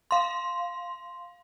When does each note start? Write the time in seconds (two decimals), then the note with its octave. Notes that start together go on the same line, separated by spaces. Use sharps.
0.11 F5 C6